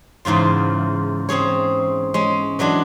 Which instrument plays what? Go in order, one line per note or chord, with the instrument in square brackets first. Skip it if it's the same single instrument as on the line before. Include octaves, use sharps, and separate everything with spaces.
[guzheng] E2 G#2 C#3 F4
C4 C#4 G#4 C#5
G#3 C#4
E3 F#3 G#3 D4